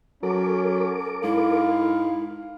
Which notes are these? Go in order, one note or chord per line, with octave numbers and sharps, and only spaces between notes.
F#3 C#4 A4 A#4 D6
G#2 E4 F5